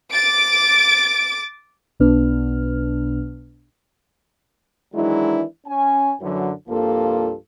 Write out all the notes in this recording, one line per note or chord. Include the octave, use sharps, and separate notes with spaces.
D6 A6 D7
B1 B2 B3 D4 B4 F6
D#3 E3 F#3 G#3 D4 E4
C#4 G#5
F#2 D3 E3 F#3
C2 G2 F3 A#3 F4 A4